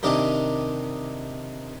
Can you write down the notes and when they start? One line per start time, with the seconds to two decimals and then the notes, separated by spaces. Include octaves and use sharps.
0.03 C3 D#3 D4 D#4 G4 A#4